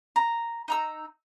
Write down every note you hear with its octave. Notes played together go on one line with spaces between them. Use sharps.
A#5
D#4 A#5 E6